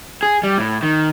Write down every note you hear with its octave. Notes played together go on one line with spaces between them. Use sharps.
G#4
G3
A2
D#3